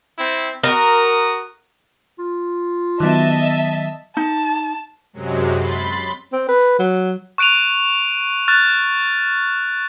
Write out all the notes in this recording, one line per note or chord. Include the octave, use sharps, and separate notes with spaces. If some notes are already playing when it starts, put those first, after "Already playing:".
C4 E4
F#4 A#4 D#6
F4
D#3 F#3 B3 D#5 E5 A5
D#4 A5
F#2 C3 F#3 G#3
B5 C6 A6
C4
B4
F#3
C#6 F#6 D7 D#7 F7
C#6 F6 F#6 A6